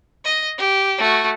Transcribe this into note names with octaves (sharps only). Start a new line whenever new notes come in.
D#5
G4
A3 F#4